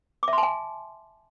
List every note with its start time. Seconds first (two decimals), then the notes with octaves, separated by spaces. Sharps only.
0.23 D6
0.28 E5
0.33 C6
0.38 A5
0.43 G#5